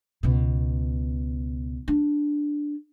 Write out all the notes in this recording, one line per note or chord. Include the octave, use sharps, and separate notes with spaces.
C#2 B2
D4